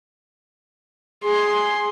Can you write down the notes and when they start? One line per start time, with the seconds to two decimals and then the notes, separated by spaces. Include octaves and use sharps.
1.24 G#4 C6